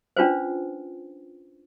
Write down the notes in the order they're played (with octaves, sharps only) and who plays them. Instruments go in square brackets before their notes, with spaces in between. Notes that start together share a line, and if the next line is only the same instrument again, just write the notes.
[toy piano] C#4 D4 F4 B4 C5